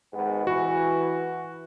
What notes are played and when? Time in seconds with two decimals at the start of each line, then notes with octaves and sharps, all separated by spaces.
0.14 G#1 G#2 B3
0.47 E3 F#4